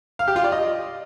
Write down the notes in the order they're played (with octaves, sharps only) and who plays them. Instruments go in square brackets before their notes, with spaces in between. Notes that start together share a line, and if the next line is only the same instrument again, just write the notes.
[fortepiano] F5
G4
F4
D5
D#5